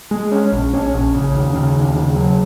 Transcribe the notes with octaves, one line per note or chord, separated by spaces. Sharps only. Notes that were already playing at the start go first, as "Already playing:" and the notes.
G#3
C#4
A#1
C#4
A#1
C#3
D#2
C#3
D#2
C#3
F#3